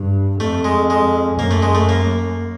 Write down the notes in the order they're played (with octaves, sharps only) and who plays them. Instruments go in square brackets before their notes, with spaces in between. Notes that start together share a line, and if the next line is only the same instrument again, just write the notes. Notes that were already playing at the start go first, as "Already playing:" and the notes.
Already playing: [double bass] G2
[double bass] F2 [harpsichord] A3
[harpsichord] G#3
G#3
[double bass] F#2 [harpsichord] A#3
[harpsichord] A3
G#3
A3
A#3